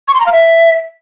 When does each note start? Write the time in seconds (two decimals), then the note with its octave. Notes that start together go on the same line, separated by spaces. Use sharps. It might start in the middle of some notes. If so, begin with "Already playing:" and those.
0.08 C#6
0.14 C6
0.20 A#5
0.26 F5
0.32 E5